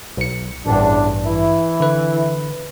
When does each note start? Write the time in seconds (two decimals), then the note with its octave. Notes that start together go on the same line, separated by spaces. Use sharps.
0.17 B1 C#7
0.66 A1 E2 G2 C#3 D4
1.26 E3 E4
1.80 D3 B4